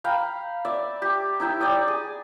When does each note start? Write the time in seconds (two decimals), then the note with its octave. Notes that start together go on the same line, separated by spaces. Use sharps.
0.04 F5 G5 A#5 B5
0.65 D5 E5
1.02 G4
1.40 D#4 E4 G5
1.60 D5 G5 D#6
1.88 G#4